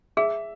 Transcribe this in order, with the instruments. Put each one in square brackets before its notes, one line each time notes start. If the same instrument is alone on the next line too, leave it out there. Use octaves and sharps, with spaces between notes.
[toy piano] G#4 [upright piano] E5